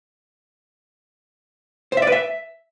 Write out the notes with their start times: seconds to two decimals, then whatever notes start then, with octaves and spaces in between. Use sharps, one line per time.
1.92 C5
1.97 E5
2.02 D5
2.07 B4
2.12 E5